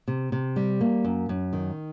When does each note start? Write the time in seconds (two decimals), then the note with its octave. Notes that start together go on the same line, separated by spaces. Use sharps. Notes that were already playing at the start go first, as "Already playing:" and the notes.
0.08 C3
0.32 C3
0.56 G3
0.81 A#3
1.05 F#2
1.29 F#2
1.53 D#3